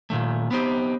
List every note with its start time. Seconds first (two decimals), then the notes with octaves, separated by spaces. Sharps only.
0.10 A#2 D#3 A3
0.51 B3 C4 D#4 G4